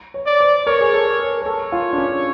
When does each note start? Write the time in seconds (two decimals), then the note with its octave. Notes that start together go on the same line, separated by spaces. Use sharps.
0.14 C#5
0.26 D5
0.40 C5
0.66 A#4 C#5
0.81 G#4
0.93 A4
1.19 A#4
1.42 A#4
1.46 A4 C#5
1.72 F4
1.93 D4
1.98 C#4